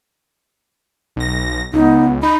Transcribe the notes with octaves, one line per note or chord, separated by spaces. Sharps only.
B1 A#6
C#2 B3 D#4
D#4 B5